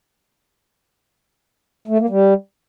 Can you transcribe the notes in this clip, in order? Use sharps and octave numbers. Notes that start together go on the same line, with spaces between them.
A3
A#3
G3